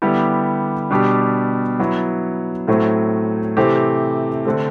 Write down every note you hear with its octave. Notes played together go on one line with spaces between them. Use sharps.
D3 G3 B3 E4 G4
B2 G3 D4 G4
F#3 B3 E4
A2 F#3 A3 C4
C3 E3 A3 C4 G4
D3 A3 C4